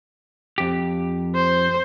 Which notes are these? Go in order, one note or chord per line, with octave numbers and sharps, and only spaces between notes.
F2 G4
C5